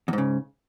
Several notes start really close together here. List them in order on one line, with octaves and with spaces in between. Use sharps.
E2 G#2 C#3